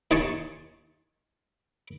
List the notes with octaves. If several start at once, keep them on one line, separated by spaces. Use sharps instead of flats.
D#2 D#4 G#5 A5 C6 C#6